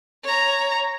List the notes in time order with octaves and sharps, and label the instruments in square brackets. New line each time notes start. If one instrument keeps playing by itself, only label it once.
[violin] C#5 A#5